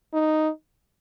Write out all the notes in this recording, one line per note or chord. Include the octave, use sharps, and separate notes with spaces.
D#4